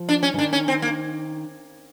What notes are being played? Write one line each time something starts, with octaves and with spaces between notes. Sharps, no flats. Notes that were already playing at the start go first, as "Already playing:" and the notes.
Already playing: F3
D4
C#4
E3
D#3 D4
C#4
C4
A#3